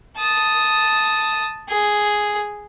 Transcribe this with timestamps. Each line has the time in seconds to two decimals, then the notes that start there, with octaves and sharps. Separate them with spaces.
0.18 A5 D#6
1.70 G#4